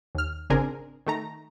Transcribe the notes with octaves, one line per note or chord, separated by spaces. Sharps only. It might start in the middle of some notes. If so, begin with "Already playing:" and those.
D#2 F6
G#1 C#3 C4 D4 G#4 A#4
D#3 A3 A#5